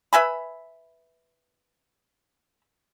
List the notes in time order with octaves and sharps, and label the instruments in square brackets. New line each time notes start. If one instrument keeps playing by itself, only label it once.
[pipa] B4 E5 G#5 B5